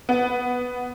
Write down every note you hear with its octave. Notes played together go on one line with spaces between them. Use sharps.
B3